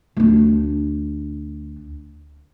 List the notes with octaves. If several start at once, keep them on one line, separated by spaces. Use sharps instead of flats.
D2 D4